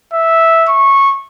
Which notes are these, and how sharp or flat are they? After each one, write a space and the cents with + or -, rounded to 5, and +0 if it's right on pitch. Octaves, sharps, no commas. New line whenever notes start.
E5 -5
C#6 -15